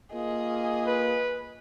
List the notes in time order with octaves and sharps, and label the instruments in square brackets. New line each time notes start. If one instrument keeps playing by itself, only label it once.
[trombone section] A#3 F4 [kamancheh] G#4 D#5
[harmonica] B4